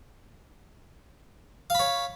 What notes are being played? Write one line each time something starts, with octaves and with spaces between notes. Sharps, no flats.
C#5 F5 B5